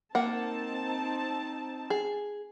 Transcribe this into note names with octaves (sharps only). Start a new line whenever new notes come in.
A#3 C4 D#4 F#5 A5
G#4